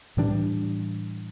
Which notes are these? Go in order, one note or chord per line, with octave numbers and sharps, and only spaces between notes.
A2 E3 G3 D4